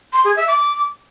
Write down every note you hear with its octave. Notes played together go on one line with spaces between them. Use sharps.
C6
G#4
E5
D6